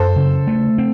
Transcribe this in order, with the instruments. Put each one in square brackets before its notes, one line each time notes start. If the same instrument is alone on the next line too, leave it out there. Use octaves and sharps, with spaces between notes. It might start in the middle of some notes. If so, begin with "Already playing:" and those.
Already playing: [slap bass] F#2 [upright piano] A4 C5
[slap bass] C#3
A3
C4